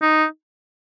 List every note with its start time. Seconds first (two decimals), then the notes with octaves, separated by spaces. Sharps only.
0.02 D#4